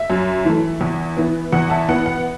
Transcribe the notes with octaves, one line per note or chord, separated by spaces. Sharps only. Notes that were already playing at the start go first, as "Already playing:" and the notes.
Already playing: E5
F#2
E3 A3
E2
E3 B3
E2 F#5
E5 A5
E3 B3 F#5
F#5